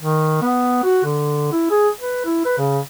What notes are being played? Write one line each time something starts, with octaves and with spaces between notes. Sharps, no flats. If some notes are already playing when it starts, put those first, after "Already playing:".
D#3
B3
F#4
D3
E4
G#4
B4
E4
B4
C#3